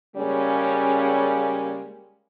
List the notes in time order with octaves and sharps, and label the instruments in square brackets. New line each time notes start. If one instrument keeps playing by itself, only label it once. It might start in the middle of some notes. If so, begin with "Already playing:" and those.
[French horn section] C#3 G3 G#3 A#3 C#4